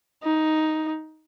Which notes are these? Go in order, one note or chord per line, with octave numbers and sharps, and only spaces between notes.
D#4